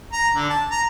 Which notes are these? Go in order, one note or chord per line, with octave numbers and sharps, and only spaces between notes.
A#5
D3
A5
A#5